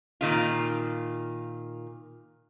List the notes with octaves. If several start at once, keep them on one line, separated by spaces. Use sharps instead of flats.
A#2 D#3 F4